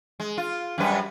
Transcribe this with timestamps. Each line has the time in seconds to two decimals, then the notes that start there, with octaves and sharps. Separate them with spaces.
0.20 G#3
0.37 F4
0.78 F#2 G3 B4